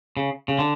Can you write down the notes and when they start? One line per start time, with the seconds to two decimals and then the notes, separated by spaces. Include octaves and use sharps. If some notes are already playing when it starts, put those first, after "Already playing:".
0.17 C#3
0.48 C#3
0.59 D3